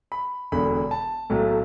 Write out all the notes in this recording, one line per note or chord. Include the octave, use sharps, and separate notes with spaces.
B5
E1 E2 D3 B5
A5
B1 A2 F#3 A3